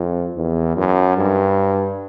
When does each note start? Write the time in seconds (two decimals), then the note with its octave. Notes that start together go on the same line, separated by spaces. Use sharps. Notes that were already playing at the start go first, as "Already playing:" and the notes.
Already playing: F2
0.36 E2
0.77 F#2
1.17 G2